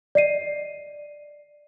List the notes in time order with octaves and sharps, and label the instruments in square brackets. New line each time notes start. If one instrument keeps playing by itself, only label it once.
[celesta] D5 D#5 C7 D#7